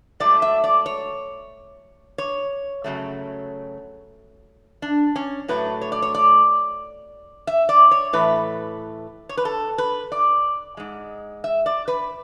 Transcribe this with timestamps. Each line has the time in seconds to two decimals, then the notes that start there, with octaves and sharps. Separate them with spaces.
0.20 G#2 F#3 A3 D5
0.42 E5
0.64 D5
0.86 C#5
2.18 C#5
2.84 F#2 C#3 F#3 A3
4.82 D4
5.16 C#4
5.48 A2 F#3 A3 B4
5.81 C#5
5.92 D5
6.02 C#5
6.14 D5
7.47 E5
7.69 D5
7.91 C#5
8.13 A2 E3 A3 B4
9.29 C#5
9.37 B4
9.45 A4
9.78 B4
10.12 D5
10.77 G#2 G#3
11.44 E5
11.66 D5
11.88 B4